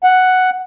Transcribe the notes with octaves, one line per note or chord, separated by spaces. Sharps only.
F#5